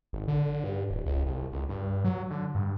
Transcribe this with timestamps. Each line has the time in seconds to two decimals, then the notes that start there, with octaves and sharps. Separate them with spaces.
0.13 G#1
0.28 D3
0.64 G2
0.90 D1
1.06 C#2
1.26 C2
1.52 C#2
1.69 G2
2.04 F#3
2.31 D3
2.55 G2